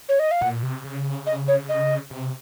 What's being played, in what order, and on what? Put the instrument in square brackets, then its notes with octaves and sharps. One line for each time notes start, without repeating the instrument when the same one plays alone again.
[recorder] C#5
D#5
F5
[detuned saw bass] A#2 [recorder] F#5
[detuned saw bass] C3
C#3
[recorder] D#5
C#5
D#5
[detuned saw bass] C3